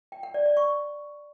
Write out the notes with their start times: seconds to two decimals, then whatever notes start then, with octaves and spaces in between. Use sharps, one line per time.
0.12 G5
0.23 F#5
0.34 D5
0.46 D5
0.57 C#6